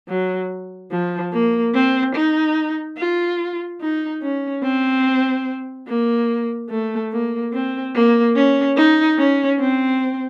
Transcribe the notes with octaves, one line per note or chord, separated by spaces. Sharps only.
F#3
F3
A#3
C4
D#4
F4
D#4
C#4
C4
A#3
A3
A#3
C4
A#3
C#4
D#4
C#4
C4